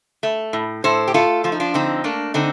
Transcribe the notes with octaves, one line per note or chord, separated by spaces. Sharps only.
A3
A2
A2 A4 C5
G4
A3 F4 A4
F3 F4
D#4
D4 F4
D3 C4 D#4
A3 A#3 D4
D3 C4 D#4